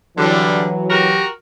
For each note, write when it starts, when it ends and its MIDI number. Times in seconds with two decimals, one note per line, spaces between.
0.18 0.67 50
0.18 1.21 52
0.18 1.21 54
0.18 0.67 55
0.90 1.28 66
0.90 1.28 67
0.90 1.28 70